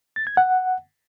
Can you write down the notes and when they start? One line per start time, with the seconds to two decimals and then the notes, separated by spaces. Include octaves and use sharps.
0.16 A6
0.27 G#6
0.37 F#5